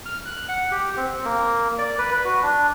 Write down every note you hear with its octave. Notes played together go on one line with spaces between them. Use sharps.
F6
F#6
F#5
G4
C4
A#3
D5
B4
B4
F#4
D4